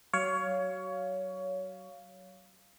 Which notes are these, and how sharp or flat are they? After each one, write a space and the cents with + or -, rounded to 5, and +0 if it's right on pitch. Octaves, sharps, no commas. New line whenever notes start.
F#3 +30 C#5 +20 F5 +0